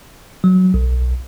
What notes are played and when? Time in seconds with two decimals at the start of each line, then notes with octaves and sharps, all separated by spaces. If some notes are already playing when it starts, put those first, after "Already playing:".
0.44 F#3
0.74 B1